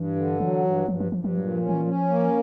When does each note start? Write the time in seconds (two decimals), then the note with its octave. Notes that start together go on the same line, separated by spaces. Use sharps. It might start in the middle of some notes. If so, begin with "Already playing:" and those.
Already playing: G2 E3
0.16 D3
0.40 E3 F#3
0.64 G2
0.88 G2 F3
1.00 F3
1.12 G2 F3
1.24 F3
1.37 A#2 F#3
1.53 F3
1.61 C#4
1.69 E3
1.85 F3 C#4
2.09 A#3